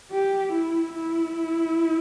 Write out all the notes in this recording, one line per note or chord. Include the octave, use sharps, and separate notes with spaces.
G4
E4
E4